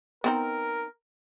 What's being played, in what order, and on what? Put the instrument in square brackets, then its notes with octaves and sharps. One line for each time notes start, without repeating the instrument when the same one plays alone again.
[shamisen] B3 C4 D#4 [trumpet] A#4